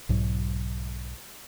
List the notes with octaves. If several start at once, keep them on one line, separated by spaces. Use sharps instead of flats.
B1 G#2 F#3